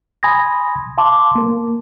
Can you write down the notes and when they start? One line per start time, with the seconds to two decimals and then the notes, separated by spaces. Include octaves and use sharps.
0.23 G#5 B5 C6 D#6 G#6 A#6
0.98 F5 A5 C6 D6
1.35 A#3 A#4